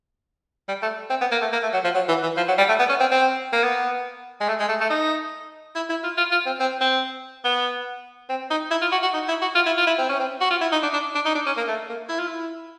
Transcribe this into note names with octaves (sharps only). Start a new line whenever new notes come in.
G3
A3
C4
B3
A#3
A3
A#3
A3
F#3
F3
F#3
E3
E3
F3
F#3
G3
A3
B3
C#4
C4
C4
A#3
B3
G#3
A3
G#3
A3
A3
D#4
E4
E4
F4
F4
F4
C4
C4
C4
B3
C4
D#4
E4
F4
F#4
F#4
D#4
E4
F#4
F4
E4
F4
E4
C4
C#4
C4
F#4
F4
E4
D#4
D4
D4
D4
D#4
D4
C#4
A#3
A3
A#3
E4
F4
E4